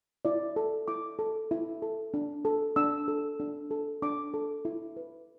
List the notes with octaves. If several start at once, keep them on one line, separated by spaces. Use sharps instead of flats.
E4 D5
A4
E4 D6
A4
E4
A4
D4
A4
D4 E6
A4
D4
A4
D4 D6
A4
E4
B4